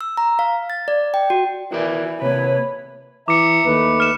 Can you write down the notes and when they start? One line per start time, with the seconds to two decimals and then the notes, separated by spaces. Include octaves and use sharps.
0.01 E6
0.17 A#5
0.39 F5
0.70 A6
0.88 D5
1.14 G5
1.30 F#4
1.72 E3 F#4 A#4 D5
2.22 C3 A#3 B4 C#5
3.28 E3 E5 A#5 D6 C#7
3.66 D#2 A3 B4
4.00 F6 E7